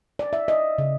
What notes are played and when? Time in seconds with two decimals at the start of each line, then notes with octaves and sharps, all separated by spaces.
0.19 D5
0.33 E5
0.48 D#5
0.78 C#3